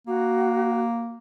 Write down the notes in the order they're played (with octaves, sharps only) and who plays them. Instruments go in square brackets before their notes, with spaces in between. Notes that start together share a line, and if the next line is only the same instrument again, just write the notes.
[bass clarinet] A#3 [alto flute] F#4